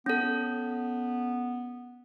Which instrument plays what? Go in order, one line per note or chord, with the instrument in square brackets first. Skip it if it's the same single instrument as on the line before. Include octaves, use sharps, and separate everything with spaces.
[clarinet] B3 [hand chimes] C#4 A4